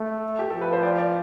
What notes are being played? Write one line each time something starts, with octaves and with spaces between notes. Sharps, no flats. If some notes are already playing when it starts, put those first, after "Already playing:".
Already playing: A3
G4
F3 A4
B4
C5
D5
D5